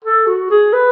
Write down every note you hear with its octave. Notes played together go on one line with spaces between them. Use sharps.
A4
F#4
G#4
B4